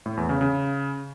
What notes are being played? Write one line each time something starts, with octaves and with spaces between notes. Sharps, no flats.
A2
E2
C#3
C#3